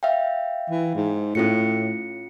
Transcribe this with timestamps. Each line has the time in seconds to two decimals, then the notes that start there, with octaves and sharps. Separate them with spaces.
0.03 E5 F5 G5
0.70 E3
0.95 G#2
1.35 A2 C#4 F4 C#7